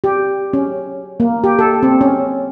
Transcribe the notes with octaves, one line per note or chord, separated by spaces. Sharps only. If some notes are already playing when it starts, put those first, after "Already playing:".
G4
C#4
A#3
G4
A4
C4
C#4